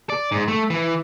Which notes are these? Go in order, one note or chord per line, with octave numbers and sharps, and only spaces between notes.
D5
G#2
A3
E3